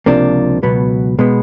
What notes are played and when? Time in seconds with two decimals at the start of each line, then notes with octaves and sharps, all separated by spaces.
0.06 C#2 C3 F3 A#3 D4
0.63 C#2 B2 F#3 B3
1.19 B2 G#3 B3